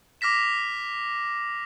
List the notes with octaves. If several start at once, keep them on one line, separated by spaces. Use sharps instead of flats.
D6 F6 A#6 B6 E7